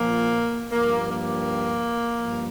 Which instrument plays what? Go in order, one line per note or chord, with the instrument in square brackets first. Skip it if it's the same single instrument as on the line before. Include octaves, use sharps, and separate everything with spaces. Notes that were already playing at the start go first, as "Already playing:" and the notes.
Already playing: [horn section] A#2 F3 A#3
G2 F3 A#3
A#3
G2 F3